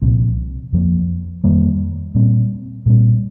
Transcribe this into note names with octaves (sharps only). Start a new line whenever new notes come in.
C2 A#2 F3 C4
F2 F3 A#3
F2 D#3 G3 A#3
A#2 G3 C4
A#2 G3 C4